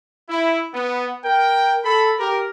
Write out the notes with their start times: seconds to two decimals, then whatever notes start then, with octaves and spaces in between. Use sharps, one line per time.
0.29 E4
0.74 B3
1.24 A#4 G5
1.84 A4 B5
2.19 G4 A#4